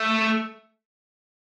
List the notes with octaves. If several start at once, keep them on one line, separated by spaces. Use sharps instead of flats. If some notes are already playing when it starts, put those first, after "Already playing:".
Already playing: A3